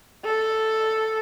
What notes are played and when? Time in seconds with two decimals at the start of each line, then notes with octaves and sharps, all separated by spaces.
0.25 A4